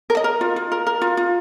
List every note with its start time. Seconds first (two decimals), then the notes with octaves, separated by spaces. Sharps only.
0.10 A#4
0.17 D#5
0.24 A#4
0.41 F4
0.56 F4
0.72 A#4
0.87 A#4
1.02 F4
1.17 F4